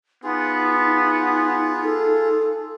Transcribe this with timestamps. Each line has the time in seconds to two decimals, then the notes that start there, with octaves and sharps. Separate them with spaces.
0.24 B3 D#4 F4 G#4
1.84 A4